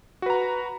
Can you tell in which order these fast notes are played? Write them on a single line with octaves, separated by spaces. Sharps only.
F#4 B4 A#5